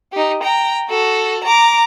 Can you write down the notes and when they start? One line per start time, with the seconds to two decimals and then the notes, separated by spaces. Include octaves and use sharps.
0.12 D#4 G4
0.43 G5 A#5
0.90 F#4 A4
1.44 A#5 D6